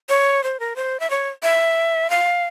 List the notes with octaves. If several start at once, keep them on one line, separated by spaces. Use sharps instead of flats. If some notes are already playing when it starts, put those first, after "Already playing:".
C#5
C5
A#4
C5
E5
C#5
E5
F5